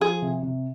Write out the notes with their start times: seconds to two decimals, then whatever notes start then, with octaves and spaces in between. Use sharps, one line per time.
0.01 F3 G#4
0.22 C3
0.43 C3